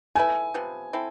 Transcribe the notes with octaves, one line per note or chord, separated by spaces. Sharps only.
A3 E4 B4 E5 G#5
C3 F3 B3
C4 E4 A4